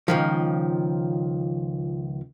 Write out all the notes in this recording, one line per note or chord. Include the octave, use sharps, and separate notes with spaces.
C#2 D#3 F3